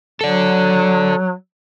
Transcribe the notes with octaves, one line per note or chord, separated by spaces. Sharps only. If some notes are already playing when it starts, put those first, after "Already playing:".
F#3 A4 D5